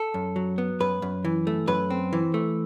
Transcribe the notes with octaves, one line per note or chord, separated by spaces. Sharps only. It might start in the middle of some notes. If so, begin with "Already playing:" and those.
Already playing: A4
F#2
F#3
B3
F#2 B4
F#2
E3
A3
F#2 B4
C4
E3
A3